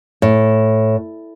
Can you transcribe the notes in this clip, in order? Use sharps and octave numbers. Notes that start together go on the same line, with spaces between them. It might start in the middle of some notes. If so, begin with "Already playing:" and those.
A2